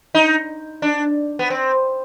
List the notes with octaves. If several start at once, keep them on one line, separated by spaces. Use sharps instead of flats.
D#4
D4
B3
C4